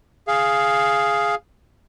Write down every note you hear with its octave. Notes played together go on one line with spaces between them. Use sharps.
G#4 F5